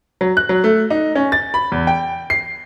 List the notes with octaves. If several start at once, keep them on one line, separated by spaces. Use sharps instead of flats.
F#3
F#6
F#3
A3
D#4
C#4
A6
B5
E2
G5
C7